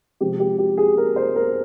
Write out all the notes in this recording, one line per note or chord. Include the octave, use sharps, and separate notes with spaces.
C3 F3 G#3 C4 G4
G4
G4
G#4
A#4
C5
A#4